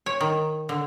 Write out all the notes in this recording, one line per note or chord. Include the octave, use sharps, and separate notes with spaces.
C#5
D#3
D3